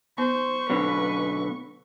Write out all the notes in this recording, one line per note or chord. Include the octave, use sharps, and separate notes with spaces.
B3 C5 C#6
F#2 B2 D3 B4